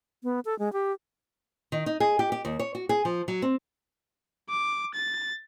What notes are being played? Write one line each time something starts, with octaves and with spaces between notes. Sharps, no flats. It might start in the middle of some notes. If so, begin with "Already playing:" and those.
B3
A4
G#3
G4
D#3
D#4
G#4
G4
G4
D#2
C#5
F#4
G#4
F3
F#3
C4
D6
A6